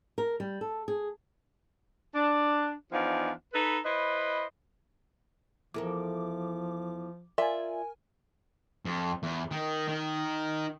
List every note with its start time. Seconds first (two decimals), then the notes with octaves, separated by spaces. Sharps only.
0.18 A#4
0.40 G3
0.61 A4
0.88 G#4
2.14 D4
2.93 E2 F3 D4 D#4 F5
3.54 D#4 A4 B4
3.85 E4 B4 C5 D#5
5.74 E2 F3 A4 A#4 D6
7.38 F4 A#4 D5 E5 G#5
8.85 F2
9.23 E2
9.51 D#3
9.88 D#3